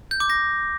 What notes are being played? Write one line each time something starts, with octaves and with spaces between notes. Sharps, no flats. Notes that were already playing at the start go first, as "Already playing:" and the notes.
G6
D6
A#6